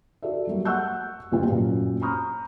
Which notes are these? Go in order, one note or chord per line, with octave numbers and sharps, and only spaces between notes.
F#4 A4 D5 E5
F#3 G3 A#3
F#5 C#6 E6 F#6 G6
F#1 C2 C#3 A3 F4 G5
F#2 A#2 C#4
A#5 B5 C#6 D#6 F6 G6